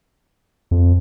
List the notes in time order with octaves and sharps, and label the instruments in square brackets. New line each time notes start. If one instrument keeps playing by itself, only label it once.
[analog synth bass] F2